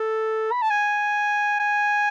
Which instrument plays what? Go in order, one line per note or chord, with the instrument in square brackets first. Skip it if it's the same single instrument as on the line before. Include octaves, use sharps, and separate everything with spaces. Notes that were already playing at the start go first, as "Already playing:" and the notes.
Already playing: [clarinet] A4
B5
A5
G#5
G#5